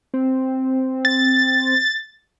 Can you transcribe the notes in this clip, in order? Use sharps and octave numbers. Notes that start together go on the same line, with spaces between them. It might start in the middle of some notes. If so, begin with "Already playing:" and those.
C4
A6